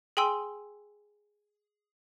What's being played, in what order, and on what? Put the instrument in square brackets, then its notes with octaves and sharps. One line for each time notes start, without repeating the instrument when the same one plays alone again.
[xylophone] G#4 G5 G#5 C6 E6